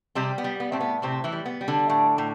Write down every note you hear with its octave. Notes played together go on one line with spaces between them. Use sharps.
C3 G3 C4
B3
G3
B3
A2 C4
B3
A2 C3 C4
E3 E4
G3
B3
G3
D3 D4
A2
A2